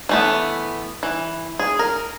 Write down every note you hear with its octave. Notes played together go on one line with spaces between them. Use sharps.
E3 A3 B3
E3
G#4
A#4